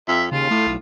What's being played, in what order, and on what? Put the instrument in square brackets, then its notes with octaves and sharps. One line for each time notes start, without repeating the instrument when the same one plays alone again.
[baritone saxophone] F2 [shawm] E5
[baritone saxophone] D#2 [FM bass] C#3 [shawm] F4
[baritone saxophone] A2 [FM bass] A3
[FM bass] B1